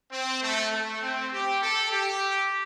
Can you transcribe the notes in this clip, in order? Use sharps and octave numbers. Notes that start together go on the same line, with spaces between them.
C4
A3
A3
C4
G4
A4
G4